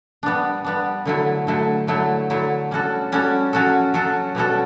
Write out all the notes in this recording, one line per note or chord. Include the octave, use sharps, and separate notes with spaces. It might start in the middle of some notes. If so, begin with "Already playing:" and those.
G3 B3 D4
G3 B3 D4
D3 F#3 A3 E4
D3 F#3 A3 E4
D3 F#3 A3 E4
D3 F#3 A3 E4
G3 C#4 F#4 A4
G3 C#4 F#4 A4
F#3 C#4 F#4 A4
F#3 C#4 F#4 A4
B2 G3 C#4 F#4 A4